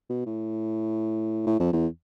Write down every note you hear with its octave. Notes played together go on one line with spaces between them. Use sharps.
B2
A2
A2
F2
E2